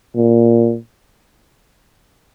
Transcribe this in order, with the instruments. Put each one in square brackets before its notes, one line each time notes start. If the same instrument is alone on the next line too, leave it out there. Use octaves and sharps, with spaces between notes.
[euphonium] A#2